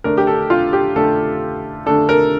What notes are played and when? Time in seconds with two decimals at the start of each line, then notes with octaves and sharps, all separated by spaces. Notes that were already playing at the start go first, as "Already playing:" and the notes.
0.04 D3 A3 D4 A#4
0.18 G4
0.27 A4
0.50 F4
0.73 G4
0.95 D3 A3 D4 A4
1.86 D3 A3 D4 A4
2.09 A#4